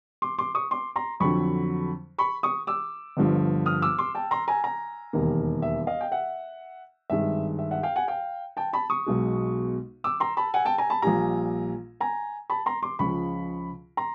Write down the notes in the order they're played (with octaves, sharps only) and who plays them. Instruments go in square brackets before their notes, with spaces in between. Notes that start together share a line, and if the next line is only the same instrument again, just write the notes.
[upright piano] C6 D6
C6 D6
C#6 D#6
C6 D6
A#5 C6
F2 D3 F#3 B5 C#6
B5 C#6
C#6 D#6
D6 E6
G1 G2 D3 F3
D#6 F6
D6 E6
C6 D6
G5 A5
A#5 C6
G#5 A#5
G#5 A#5
E1 D#2 D#3 G3 A#3
E5
D#5 F5
G5
E5 F#5
G#1 G2 D#3 G#3 E5
E5
E5 F#5
F5 G5
F#5 G#5
F5 G5
G5 A5
A5 B5
C#6 D#6
B1 B2 G#3
D6 E6
A#5 C6
A5 B5
F#5 G#5
G5 A5
G#5 A#5
A5 B5
A#1 A#2 G3 G#5 A#5
G#5 A#5
A5 B5
A#5 C6
C6 D6
C#2 C#3 F3 B5 C#6
A#5 C6